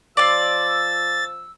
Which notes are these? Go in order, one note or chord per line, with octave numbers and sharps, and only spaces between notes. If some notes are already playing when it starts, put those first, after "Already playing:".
F3 D5 C6 E6 A6